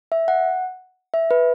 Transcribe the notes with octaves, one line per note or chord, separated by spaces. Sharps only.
E5
F#5
E5
B4